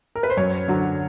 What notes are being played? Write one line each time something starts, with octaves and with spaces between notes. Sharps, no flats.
A#4
B4
C5
F#2 C#5
D3 F#3